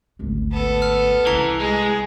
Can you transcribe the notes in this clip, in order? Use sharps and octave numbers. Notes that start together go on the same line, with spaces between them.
G#1 D2
B3 A4
F6
C2 E3 A#5
G#3 G#4